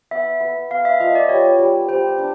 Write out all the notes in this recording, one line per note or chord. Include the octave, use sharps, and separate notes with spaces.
B3 E5
B3
B3 F5
E5
F3 D#5
D5
G3 C#5
G3
G3 C5
D4